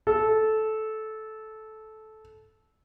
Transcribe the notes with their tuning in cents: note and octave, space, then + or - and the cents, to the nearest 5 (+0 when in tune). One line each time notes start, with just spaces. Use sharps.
A4 -15